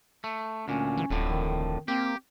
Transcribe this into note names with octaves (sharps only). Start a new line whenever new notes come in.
A3
D2 A#2 C#4
E3
D1 F2 A2 D3
D#3
A#3 C4 G4